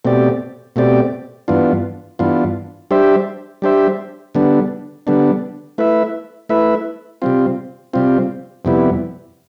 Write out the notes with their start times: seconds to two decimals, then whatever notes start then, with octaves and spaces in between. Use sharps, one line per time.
0.05 B2 A3 C4 G4 D5
0.76 B2 A3 C4 G4 D5
1.48 G2 E3 B3 D4 F4
2.19 G2 E3 B3 D4 F4
2.91 G3 D4 G4 C5 E5
3.62 G3 D4 G4 C5 E5
4.35 D3 G3 B3 D4
5.07 D3 G3 B3 D4
5.78 A3 E4 B4 E5
6.49 A3 E4 B4 E5
7.22 C3 G3 C4 F4
7.93 C3 G3 C4 F4
8.65 F2 C3 G3 B3 E4